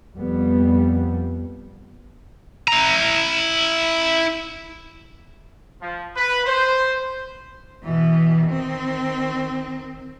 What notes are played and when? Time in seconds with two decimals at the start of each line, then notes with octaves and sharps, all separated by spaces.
0.16 F2 G3 B3
2.68 E4 A#5
5.81 F3
6.16 B4
6.46 C5
7.83 B2 E3
8.44 D#3 C4